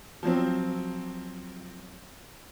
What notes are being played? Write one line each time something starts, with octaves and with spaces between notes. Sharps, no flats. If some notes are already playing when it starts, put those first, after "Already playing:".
F3 F#3 C4